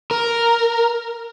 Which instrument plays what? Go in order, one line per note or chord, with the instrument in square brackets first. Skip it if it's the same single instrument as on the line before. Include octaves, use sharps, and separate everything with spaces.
[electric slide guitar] A#4